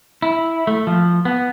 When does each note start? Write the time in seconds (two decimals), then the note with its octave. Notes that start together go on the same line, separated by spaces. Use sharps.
0.22 E4
0.67 A3
0.87 F3
1.25 B3